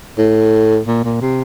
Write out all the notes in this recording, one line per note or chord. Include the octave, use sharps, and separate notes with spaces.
A2
A#2
A#2
C3